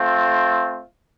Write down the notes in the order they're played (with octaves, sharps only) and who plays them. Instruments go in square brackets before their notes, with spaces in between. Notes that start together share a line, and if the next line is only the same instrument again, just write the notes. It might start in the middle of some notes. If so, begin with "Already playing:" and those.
Already playing: [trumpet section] A3 C4 F4